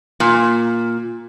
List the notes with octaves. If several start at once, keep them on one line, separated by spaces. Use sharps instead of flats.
A#2